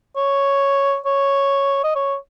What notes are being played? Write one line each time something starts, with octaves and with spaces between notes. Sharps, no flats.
C#5
C#5
D#5
C#5